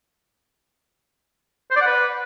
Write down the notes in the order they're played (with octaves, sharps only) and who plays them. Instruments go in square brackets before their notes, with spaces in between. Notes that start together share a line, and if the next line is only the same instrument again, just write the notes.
[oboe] C5
D5
F#5
B4